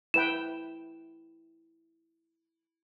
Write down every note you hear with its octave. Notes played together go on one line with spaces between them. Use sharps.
E4 B4 G5 E7